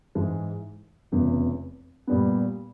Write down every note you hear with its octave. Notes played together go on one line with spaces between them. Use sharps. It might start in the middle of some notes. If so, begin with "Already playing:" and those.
G#2 E3 G#3
F1 E2 C#3
A#2 G3 B3